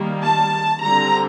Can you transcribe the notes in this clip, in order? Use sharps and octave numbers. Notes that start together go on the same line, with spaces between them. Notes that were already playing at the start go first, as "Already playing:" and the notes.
Already playing: D#3 G3 A#3
A5
D3 G3 C4 A#5